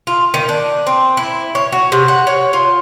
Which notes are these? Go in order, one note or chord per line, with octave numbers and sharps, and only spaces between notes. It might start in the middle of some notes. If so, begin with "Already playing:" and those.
F4
D#3
D4
C4
E4
C#5
F#4
C3
F#5
C#5
F4